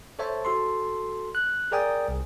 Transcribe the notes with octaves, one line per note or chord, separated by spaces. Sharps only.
A4 C5 C#5 E5 A5
F#4 A4 C6
F#6
G#4 A#4 D5 G5 G#5 D#6
C2